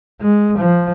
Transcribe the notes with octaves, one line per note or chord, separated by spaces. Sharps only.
G#3
F3